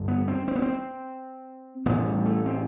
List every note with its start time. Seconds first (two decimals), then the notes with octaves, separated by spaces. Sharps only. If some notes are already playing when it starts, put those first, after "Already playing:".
Already playing: A1 G2 D3
0.08 B3
0.28 C4
0.48 C4
0.55 B3
0.62 C4
1.86 A1 A2 B3
1.99 F3
2.06 G3
2.26 A3
2.46 C4